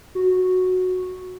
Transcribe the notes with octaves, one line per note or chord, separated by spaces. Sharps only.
F#4